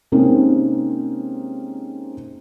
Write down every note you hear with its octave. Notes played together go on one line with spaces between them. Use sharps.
C3 G#3 A#3 C4 C#4 D#4